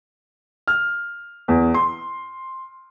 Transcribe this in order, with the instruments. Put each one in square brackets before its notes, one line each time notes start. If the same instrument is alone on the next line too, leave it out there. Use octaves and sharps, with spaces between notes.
[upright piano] F6
E2
C6